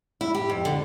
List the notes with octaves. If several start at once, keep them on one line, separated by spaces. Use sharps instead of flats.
E4
G4
F2
D3